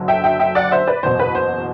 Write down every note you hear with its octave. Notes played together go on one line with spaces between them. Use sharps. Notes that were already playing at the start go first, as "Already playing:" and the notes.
Already playing: F#1 F#2 D3 F#3
E5 G5
E5 G5
E5 G5
D5 F#5
C5 E5
B4 D5
F#1 E2 B2 C5
B4
C5